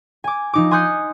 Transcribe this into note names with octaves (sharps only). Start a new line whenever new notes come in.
G#5 D6
F3 D#4 D6
G#5 C6 D#6 F#6 G6 C#7